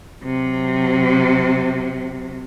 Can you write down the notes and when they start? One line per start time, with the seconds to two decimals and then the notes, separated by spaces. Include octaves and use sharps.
0.24 C3 F#3